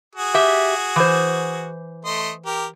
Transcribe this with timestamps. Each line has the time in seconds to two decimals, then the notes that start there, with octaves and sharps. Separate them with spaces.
0.15 F#4 G#4
0.34 G4 E5
0.96 E3 C5
2.05 A3 D#5 C6
2.46 G4 A#4